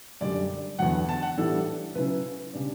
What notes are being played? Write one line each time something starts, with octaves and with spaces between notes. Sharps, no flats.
F#2 D3 G3 D5
E2 D3 F#3 F#5
A5
F#5
A2 E3 G3 D4 A4
C#3 F#3 C#4 E4 B4
C#3 G3 D4